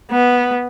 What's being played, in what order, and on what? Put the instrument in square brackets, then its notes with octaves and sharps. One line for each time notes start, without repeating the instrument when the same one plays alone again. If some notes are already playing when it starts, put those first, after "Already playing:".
[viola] B3